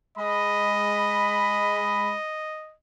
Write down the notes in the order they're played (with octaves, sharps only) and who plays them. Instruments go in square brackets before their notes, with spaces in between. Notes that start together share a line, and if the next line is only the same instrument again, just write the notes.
[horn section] G#3 B5 [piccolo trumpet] D#5